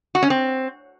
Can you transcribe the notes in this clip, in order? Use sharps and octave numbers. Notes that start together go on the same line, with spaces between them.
F#4
C#4
C4